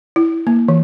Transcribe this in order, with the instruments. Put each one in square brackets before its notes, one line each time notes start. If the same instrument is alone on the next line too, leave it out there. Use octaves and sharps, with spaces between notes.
[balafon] E4
A#3
E3